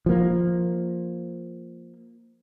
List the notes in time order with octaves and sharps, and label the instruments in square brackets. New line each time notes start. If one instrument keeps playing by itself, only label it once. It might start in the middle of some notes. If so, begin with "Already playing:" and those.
[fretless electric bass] F3 A#3